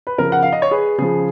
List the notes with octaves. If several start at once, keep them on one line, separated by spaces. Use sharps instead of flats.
B4
C#3 F3 A#4
F#5
F5
D#5
C#5
G#4 B4
C#3 F3 G#4